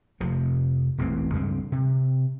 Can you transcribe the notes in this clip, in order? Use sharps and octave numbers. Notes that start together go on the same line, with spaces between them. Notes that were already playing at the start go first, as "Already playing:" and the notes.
F1 C3 F3
E1 A1 E3 C4
C#2 G2 C4
C3